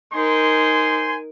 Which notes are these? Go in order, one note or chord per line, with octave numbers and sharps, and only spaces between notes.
D#4 A#4 C5 G#5 C6